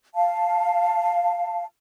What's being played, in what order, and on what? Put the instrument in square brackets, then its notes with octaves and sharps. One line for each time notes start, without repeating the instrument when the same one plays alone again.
[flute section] F5 A5